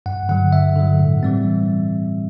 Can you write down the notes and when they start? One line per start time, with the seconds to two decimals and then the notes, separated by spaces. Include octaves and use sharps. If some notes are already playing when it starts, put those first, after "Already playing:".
0.06 G2 F#5
0.29 D3 F#3 F#5
0.53 G2 E5
0.76 D3 F#3
0.99 A2
1.23 E3 G3 C4